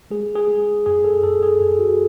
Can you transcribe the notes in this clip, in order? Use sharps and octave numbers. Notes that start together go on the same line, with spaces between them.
G#3 G#4
G#4
G#3
F#2 G#4
A4
F#2 A4
G#4
F#2
F#4